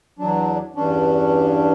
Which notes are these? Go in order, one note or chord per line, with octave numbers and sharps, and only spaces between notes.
E2 F#3 D4
E2 G2 C#4 D4